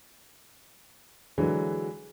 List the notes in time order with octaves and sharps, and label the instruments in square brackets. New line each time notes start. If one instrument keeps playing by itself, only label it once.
[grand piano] D3 E3 F#3 G#3